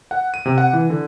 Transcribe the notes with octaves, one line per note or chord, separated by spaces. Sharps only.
F#5
D#7
C3
F#5
E3
D3